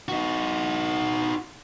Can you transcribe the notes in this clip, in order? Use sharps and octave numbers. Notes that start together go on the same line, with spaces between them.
D#4 F#4